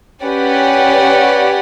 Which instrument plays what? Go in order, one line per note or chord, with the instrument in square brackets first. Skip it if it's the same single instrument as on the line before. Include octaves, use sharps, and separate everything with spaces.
[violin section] C#4 G4 B4 D5 F#5